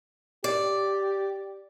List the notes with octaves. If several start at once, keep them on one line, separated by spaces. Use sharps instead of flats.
G4 D5